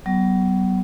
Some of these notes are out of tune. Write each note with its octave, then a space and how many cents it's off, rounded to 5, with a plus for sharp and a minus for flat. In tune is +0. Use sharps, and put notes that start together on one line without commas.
F#3 +40 B3 +0